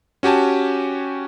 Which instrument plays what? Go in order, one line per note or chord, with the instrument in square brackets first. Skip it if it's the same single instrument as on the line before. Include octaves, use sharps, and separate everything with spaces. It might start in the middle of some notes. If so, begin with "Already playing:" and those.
[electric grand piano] C#4 F#4 G4 G#5 A5